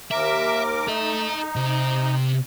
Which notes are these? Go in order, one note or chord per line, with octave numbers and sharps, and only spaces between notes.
D#2 A#4 E5 D6
D#4 A4 E5
C3